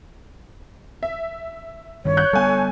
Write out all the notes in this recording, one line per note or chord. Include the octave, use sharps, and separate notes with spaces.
E5
G2 D#3 C#5
F#6 G6
G3 B3 A4 G#5